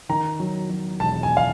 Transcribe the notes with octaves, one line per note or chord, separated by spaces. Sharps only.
D#3 A#5
F#3
F#3
E1 A5
G#5
F5